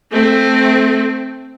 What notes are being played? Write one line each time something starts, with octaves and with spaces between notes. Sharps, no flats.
A3 C4